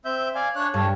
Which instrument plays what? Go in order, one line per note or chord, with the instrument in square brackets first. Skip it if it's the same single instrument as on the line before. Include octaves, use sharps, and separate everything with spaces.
[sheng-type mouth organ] C4 E5 G6
D5 F5 G#5
D4 C#5 F#6
[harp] G2 [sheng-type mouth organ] A4 C#5